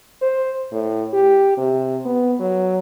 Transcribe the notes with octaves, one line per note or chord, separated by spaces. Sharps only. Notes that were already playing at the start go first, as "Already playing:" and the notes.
C5
A2
G4
C3
B3
F#3